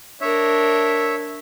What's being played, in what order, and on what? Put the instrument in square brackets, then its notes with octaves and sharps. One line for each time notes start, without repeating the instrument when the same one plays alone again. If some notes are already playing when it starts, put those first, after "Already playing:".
[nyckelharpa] D4 A#4 [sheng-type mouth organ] C#5 E5